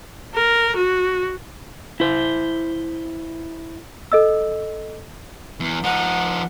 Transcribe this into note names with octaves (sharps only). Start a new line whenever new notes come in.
A#4
F#4
E4 C5
A4 D#5 E6
E2
F3 D#4 F#5